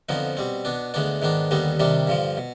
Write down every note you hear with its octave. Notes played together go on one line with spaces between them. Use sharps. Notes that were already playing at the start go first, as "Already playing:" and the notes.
F2 D3 F3 B3 D#4
B2 G3 C4
B2 B3 D4
D2 D3 G#3 B3 D4
G#2 D#3 B3 D4
D#2 D3 G3 B3 D#4
C3 D#3 G3 D4
G2 D3 F3
B2